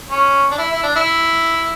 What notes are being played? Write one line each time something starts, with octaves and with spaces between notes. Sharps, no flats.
C#4
D4
E4
E4
D4
E4